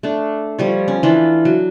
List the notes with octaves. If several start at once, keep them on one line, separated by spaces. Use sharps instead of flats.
A3 D4
F3 G3 C#5
C#4
E3 D4 F4
F#3